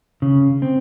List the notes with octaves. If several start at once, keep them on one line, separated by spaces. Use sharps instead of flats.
C#3
C4